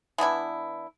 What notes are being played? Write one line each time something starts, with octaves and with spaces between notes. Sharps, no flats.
E3 B3 D4 E4